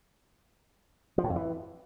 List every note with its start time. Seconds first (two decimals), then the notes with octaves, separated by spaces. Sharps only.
1.18 F3
1.24 A2
1.30 F2
1.36 E3